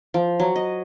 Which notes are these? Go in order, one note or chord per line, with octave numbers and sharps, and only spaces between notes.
F3
F#3
D#5